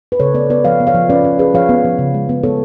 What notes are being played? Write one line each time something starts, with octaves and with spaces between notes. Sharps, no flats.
B4
C#3 A4 C#5
B3 B4 D5
B3 B4 D5
F3 C#5 F5
B3
C#5 F5
F3
C#4 B4 D5
C#4
C#4 G#4 B4
F3 C#5 F5
B3
F3
C#3
G#3
B3
B3 A4 C#5